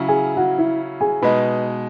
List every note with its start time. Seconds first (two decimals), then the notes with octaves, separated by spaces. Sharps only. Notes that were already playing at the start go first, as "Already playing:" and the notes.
Already playing: C#3 F#3 C#4 E4
0.08 G#4 G#5
0.37 F#4 F#5
0.58 E4 E5
1.01 G#4 G#5
1.22 B2 G#3 D#4 B4 B5